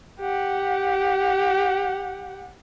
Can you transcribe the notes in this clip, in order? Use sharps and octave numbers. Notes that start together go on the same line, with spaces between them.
G4 F#5